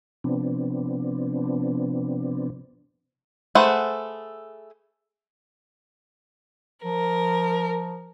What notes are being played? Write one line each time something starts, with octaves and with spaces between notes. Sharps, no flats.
C3 F3 B3 C4 D4
A3 G#4 B4 C5 F#5
F3 A#4